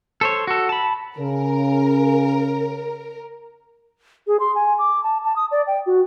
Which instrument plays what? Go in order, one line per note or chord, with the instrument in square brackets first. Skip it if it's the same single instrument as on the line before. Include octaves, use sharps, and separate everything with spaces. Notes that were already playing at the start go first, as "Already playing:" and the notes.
[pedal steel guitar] A4 C5 C#5
F#4 A4
A5 B5
[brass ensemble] C#3 [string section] A#4
[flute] G#4
C6
G#5
D6
A5
A5
D#6
D5
G5
F#4